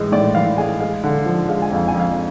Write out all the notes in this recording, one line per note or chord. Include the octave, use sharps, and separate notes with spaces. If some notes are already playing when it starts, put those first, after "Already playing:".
Already playing: A2 E3 G#3
A2 D5
E3 F5
G#3 G#5
G#3 F5
D3
F3
G#3 F5
G#5
F2 F5
G#5
F2
F5